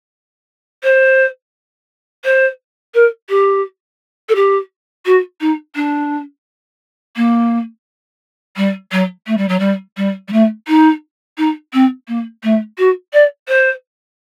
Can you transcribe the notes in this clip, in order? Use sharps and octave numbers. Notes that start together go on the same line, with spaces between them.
C5
C5
A#4
G4
A4
G4
F#4
D#4
D4
A#3
G3
F#3
A3
G3
F#3
G3
G3
G3
A3
D#4
D#4
C4
A#3
A3
F#4
D5
C5